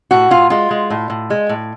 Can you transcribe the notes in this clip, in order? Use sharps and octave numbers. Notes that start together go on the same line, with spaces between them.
A2 F#4
A2 F4
G#3 F4
G#3
A2
A2
G#3
A2